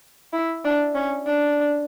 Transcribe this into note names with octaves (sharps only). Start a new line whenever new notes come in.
E4
D4
C#4
D4